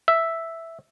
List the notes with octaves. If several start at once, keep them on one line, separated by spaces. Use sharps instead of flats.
E5